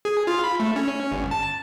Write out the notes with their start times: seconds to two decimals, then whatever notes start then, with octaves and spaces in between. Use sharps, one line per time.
0.05 G#4
0.27 F4
0.44 B5
0.60 A3
0.76 C#4
1.12 G1
1.31 A5